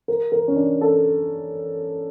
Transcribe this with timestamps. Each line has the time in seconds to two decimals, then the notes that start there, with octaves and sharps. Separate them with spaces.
0.08 A#4
0.32 A#4
0.48 C#4
0.56 D4
0.81 A4